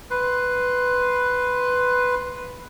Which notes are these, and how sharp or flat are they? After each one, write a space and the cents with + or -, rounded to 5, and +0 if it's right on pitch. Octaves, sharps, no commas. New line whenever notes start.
B4 +5 C6 +0